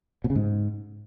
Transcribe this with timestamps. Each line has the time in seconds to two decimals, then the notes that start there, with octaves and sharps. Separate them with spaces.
0.24 B2
0.30 C#3
0.35 G#2